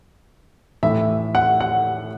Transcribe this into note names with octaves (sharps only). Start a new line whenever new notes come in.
A2 E3 E5
F#5
F#5